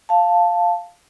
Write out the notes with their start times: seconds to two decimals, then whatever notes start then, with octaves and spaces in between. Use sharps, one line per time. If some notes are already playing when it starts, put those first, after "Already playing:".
0.09 F5 A5